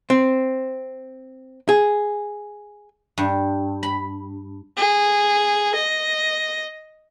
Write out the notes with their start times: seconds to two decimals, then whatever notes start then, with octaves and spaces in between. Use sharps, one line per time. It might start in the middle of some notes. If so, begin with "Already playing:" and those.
0.10 C4
1.69 G#4
3.18 G2
3.83 B5
4.77 G#4
5.75 D#5